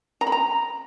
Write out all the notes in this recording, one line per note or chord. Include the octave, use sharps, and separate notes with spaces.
A#5
B5
A#5